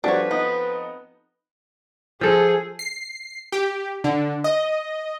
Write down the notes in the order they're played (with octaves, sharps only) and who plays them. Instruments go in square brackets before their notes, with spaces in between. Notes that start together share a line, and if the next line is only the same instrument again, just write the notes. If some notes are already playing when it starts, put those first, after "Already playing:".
[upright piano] F3 C4 A4 [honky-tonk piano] G3 F#4 [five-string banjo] D4 C#5 [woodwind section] B4
[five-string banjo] B3 [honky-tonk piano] D#4
[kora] F3 A4 [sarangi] G#4
[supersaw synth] C7
G4
D3
D#5